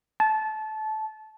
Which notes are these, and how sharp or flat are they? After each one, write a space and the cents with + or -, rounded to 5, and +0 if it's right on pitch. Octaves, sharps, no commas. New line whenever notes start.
A5 -20